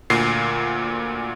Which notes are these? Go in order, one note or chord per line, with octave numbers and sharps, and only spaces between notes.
D2 A#2 C7